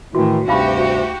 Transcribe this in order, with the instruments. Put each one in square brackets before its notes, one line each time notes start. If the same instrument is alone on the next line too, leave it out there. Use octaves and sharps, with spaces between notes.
[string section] A2 [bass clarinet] D#3 [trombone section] E3 [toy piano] F#4
[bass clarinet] D2 [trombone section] G2 C3 [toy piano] D#4 F5 B5 [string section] F#4 G4